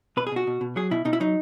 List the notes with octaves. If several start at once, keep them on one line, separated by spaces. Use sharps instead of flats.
B2 B4
G#4
B2 F#4
B2
B2
F#3 G#4
B2 E4
B2 D#4
E4
F#3 D#4